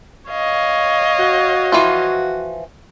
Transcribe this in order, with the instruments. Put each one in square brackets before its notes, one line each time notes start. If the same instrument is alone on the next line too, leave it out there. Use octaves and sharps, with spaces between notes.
[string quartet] C#5 D#5 F5
[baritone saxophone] F#4
[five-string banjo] E3 F3 F4